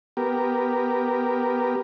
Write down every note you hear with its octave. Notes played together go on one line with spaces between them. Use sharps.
B3 G4 A#4